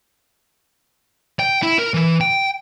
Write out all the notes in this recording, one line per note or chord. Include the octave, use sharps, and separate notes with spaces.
G5
E4
A#4
E3
G5